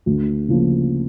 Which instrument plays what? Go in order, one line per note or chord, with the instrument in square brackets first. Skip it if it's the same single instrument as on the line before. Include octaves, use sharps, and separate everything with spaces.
[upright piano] D2
C#3 F3 A#3